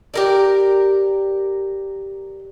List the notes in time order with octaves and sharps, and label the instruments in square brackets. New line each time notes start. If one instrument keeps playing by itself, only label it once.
[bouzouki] G4 A#4 D5